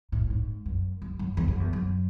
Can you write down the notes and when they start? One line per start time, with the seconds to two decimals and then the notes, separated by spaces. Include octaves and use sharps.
0.12 A2
0.30 G#2
0.66 F#2
1.02 F#2
1.19 F#2
1.37 E2
1.48 F#2
1.60 E2
1.73 F#2